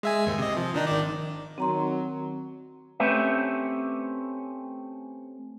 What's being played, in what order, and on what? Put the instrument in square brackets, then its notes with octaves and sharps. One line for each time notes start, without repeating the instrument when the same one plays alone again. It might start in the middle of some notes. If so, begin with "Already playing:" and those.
[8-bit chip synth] G#3 E5 G#5
D#2 G#2
C3 D#5
F3
D#3 D4 D#4
G#1 D#3 D5
[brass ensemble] D#3 F#3 [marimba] C4 A#5 C6
[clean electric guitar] A3 C4 C#4 G4 B4 E5